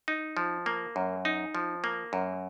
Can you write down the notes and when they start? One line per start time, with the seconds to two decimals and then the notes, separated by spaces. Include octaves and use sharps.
0.08 D#4
0.37 F3
0.66 A#3
0.96 F#2
1.25 D#4
1.55 F3
1.84 A#3
2.13 F#2